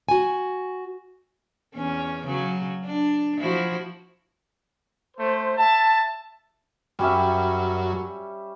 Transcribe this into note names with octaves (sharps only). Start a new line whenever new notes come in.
F#4 G#5
E2 C#4
C#3 F#3
D4
F3 E4 F#4
A3 C5
E5 A5
F#2 G3 C#4 E5